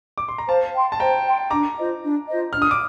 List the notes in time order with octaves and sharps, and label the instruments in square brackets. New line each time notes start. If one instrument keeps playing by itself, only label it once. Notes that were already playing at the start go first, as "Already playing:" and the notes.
[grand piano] D6
C6
A#5
[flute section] C5 [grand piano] F5 A5
[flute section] G5 C6
[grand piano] A5
[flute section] C5 [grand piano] G5 A#5
[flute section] G5 C6
[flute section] D4 [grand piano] A#5 D6
[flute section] F4 C5 D#5
D4
F4 C5 D#5
[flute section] D4 [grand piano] F6
[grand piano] D#6
D6